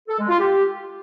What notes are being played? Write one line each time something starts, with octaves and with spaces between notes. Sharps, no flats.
A4
G#3
F4
G4